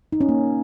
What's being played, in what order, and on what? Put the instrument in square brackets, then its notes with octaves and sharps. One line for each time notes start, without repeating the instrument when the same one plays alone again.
[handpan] D#4
C#4
A#3